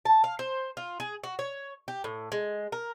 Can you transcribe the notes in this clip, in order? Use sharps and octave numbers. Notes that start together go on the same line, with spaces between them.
A5
F5
C5
F4
G#4
F#4
C#5
G4
A2
G#3
A#4